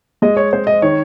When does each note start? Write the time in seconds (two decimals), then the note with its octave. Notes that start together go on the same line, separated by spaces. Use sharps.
0.22 G#3 D#5
0.37 C#5
0.52 C4 C5
0.67 D#5
0.82 D#3 C#5